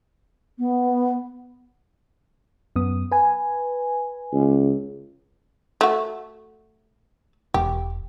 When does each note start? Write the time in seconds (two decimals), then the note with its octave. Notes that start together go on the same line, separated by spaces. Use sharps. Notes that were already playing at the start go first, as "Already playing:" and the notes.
0.59 B3
2.76 F#2 B3 D#6
3.11 B4 G#5
4.33 C#2
5.81 A3 F#4
7.54 E1 G4